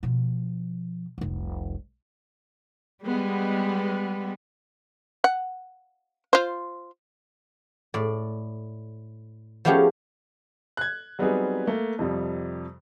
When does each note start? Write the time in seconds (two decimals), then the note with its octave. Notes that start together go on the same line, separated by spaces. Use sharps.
0.03 B2 F3
1.18 F1 C2
3.05 G3 G#3 B3
5.24 F#5
6.33 F4 C5
7.94 A2 D5
9.65 F3 A3 B3 C#4 G4 G#4
10.77 F#6 G#6
11.19 F#3 G3 B3 C4 D#4 G#4
11.67 A3 A#3
11.99 F2 C3 F3 G3